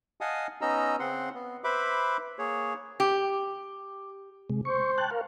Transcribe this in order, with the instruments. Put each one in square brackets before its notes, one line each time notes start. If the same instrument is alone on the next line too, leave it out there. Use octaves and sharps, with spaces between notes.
[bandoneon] D#5 F5 F#5 G#5 A5 D#6
B3 C#4 D#4 D#5 A#5 E6
C#3 C4 F#5 C6
B3
B4 C5 E5 B5 D6
A#3 G#4 C#5
[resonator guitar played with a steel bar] G4
[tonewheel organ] C3 G#3
[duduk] C5 [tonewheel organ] C#6
[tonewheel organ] G5 A5 F#6
A#4 F5